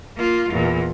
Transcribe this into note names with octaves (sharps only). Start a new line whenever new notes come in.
A#3 F4
E2 A#2